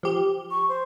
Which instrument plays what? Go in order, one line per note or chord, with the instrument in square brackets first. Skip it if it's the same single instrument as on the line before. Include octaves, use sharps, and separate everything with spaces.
[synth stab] F3 G4
[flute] C#6
C5